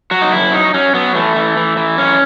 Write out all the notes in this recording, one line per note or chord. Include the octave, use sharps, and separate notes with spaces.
F#3 F#4
D#4
F#2 E4
F#3 D#4
F#3 C#4
F#3 B3
E3 A3
E3
E3
E3
F#2 C#4